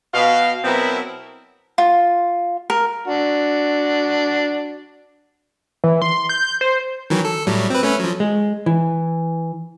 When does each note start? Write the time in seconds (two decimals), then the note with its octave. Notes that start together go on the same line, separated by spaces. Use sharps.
0.14 B2 F5
0.64 B2 F#3 B3 C4 E4 A#4
1.78 F4
2.70 A#4
3.07 D4 F#4
5.84 E3
6.02 C6
6.29 G6
6.61 C5
7.10 D#3 E3 F#3
7.25 A4
7.47 A2 F#3 G3
7.70 C4 B4
7.83 A3 C#4 B4
8.00 F3 F#3
8.20 G#3
8.66 E3